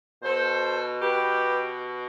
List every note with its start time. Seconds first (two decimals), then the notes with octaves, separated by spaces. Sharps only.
0.23 B2 A4 C5
1.01 G4 B4